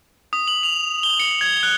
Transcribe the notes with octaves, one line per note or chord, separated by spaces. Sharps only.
D#6
F#7
F7
G7
C#7
G#6
F#6